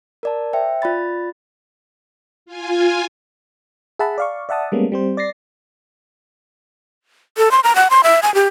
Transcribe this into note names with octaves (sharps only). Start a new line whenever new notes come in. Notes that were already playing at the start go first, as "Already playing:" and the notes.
A#4 D5 A5
C5 E5 G5
F4 D5 B5 A6
F4 G#5
G#4 E5 F#5 A5 B5
D5 F5 C#6
D5 E5 F#5 A5 D#6
G3 G#3 A#3 B3 C#4
G3 C4 C5
D5 A6 A#6 C7
A4
C6
A#5
F#5
C6
E5
G#5
G4